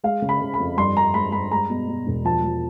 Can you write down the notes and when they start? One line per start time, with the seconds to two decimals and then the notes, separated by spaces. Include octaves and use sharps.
0.04 G#3 F5
0.22 C#3
0.29 B5
0.41 C#3
0.54 B5
0.60 F2
0.77 G2 C6
0.97 G2 A#5
1.14 G#3 B5
1.32 G2 B5
1.51 G#3 A#5
1.70 B2
1.88 B2
2.07 E1
2.25 F3 A5
2.44 F3